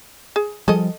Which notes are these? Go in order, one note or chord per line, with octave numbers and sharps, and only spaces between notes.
G#4
F3 G3 G#4 A4 D#5